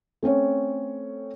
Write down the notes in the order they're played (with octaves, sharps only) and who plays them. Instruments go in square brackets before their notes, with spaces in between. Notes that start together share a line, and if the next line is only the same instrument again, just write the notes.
[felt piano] A3 C4 C#4 C#5